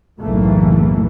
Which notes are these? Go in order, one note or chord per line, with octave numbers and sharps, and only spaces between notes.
F#1 B1 A2 E3 A3 A#3